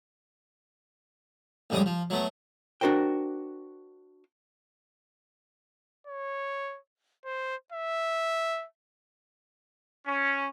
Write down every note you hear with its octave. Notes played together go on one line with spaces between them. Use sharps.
A1 F2 C#3 G3 G#3 D#6
F3
F#3 A3 B3
D4 F#4 A#4 C5 G5
C#5
C5
E5
C#4